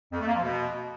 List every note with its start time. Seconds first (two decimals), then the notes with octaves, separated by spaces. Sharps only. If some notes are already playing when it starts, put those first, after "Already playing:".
0.12 F2
0.20 A3
0.27 A#3
0.35 F3
0.42 B2